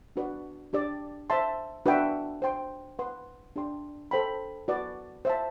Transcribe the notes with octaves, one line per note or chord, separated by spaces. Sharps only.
D4 F#4 B4 D5
D4 G4 D5
C5 E5 A5 C6
D4 F#4 B4 E5 G5
C5 G5 C6
B4 F#5 C6
D4 G4 D5 G5 C6
A4 C5 G5 B5
F#4 B4 D5
C5 E5 A5